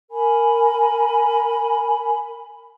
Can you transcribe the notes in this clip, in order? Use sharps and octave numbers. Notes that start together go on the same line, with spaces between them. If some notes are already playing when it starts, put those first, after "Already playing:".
A#4 G#5 B5